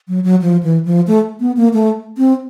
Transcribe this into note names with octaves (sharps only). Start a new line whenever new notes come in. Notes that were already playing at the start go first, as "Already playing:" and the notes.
F#3
F#3
F3
E3
F3
A3
B3
A#3
A3
C4